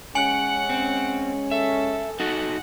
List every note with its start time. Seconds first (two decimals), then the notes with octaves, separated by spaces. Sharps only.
0.15 G#3 C#4 F#5 G#5 C#7 F#7
0.69 C4
1.51 A4 E5
2.20 D#4 F#4 A4 F#5